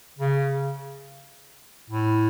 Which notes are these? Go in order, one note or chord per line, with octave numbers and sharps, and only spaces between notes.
C#3
A2